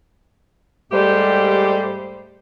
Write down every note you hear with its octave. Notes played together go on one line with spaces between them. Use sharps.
G#2 G3 A3 G4 C5 D5